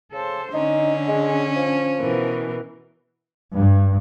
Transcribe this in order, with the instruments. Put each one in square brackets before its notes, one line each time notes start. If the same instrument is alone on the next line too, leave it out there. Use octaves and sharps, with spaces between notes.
[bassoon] C#3 [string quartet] A4 C5
[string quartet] D3 [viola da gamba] C#4 [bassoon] D#4
[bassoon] G#3
F3
[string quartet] B2 E3 A#4
[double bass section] G2